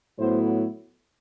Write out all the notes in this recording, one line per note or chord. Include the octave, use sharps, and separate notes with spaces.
A2 F#3 B3 E4 C5